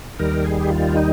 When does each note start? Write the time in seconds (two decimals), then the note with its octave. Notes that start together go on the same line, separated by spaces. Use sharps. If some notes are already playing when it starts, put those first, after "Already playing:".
0.19 D#2 D#3 G3 A#4
0.45 G#4
0.61 G4
0.70 F4
0.95 D#4